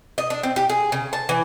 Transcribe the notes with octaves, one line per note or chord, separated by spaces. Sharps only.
D#5
D4
C4
G4
G#4
C#3
A5
E3